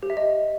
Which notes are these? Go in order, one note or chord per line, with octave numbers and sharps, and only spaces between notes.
G4
E5
D#5